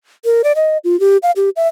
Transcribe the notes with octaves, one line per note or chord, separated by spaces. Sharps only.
A#4
D5
D#5
F4
G4
F5
G4
E5